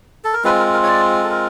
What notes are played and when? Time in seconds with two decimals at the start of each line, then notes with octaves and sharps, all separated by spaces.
0.24 A4
0.33 A#4
0.44 G#3 C4 F4 B4
0.59 A#4
0.73 A#4
0.83 C#5
0.88 D5
1.23 A4
1.31 A#4